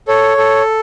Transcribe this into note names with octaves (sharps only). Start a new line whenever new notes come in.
A4 C#5
A4